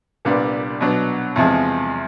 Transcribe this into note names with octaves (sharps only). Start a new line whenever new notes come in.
C2 A#2 G3 B3 D4
B2 F#3 B3 D4
E2 C3 F3 G#3